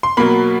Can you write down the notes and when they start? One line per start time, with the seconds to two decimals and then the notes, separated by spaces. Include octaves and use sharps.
0.03 C6
0.17 B2 F#3 A#3 B5